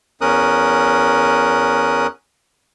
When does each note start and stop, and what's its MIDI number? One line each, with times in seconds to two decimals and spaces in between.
0.21 2.07 40
0.21 2.07 61
0.21 2.07 70
0.21 2.07 87
0.21 2.07 90